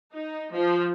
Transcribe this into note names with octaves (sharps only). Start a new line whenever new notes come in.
D#4
F3